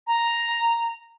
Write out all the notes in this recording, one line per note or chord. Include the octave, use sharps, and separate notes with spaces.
A#5